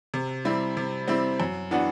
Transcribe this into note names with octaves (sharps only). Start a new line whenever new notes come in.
C3
G3 C4 E4
C3
G3 C4 E4
F#2
E3 B3 D4 F#4